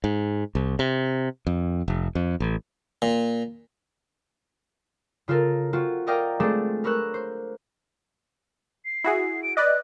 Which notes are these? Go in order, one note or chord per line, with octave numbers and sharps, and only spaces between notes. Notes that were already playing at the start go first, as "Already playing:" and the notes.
G#2
C2
C3
F2
F1
F2
A1
A#2
C#3 F4 A4 A#4
C4 F4 F#4
A#4 D5 D#5 F5 G5 A#5
G#3 A3 C4 D4 G#4 A4
A#4 B4 C#5 E6 F#6
C5
C7
E4 F#4 G#4
D7
B4 D5 D#5 F#6